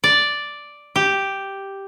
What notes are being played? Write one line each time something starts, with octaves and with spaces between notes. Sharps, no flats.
D5
G4